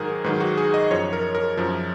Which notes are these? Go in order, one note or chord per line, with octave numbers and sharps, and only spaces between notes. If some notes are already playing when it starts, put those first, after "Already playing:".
Already playing: G#2 D#3 F#3 G#4 A#4
G#2 D#3 F#3 B4
F#4
G#4
D#5
F#2 F3 C#5
A#4
A#4
F#2 F3